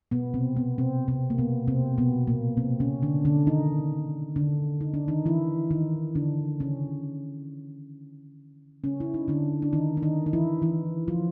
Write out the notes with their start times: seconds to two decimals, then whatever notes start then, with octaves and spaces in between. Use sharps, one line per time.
0.11 B2 B3
0.34 C3 C4
0.56 B2 B3
0.78 C3 C4
1.08 C3 C4
1.30 A#3
1.38 B2 B3
1.68 C3 C4
1.98 B2 B3
2.27 A#2 A#3
2.57 C3 C4
2.80 C#3 C#4
3.02 D3 D4
3.25 D3 D4
3.47 D#3 D#4
4.36 D3 D4
4.81 D#4
4.94 D4
5.08 D#3 D#4
5.26 E3 E4
5.71 D#3 D#4
6.15 D3 D4
6.60 C#3 C#4
8.84 C#3 C#4
9.00 E4
9.14 D#4
9.28 D3 D4
9.62 D4
9.73 D#3 D#4
9.97 D4
10.03 D#3 D#4
10.26 D#4
10.33 E3 E4
10.62 E3 E4
11.08 F3 F4